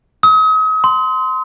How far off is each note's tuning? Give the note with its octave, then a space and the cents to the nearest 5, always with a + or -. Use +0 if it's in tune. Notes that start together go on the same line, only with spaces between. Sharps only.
D#6 +40
C6 -15